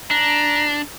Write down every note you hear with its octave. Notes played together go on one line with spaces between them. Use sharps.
D4 A#5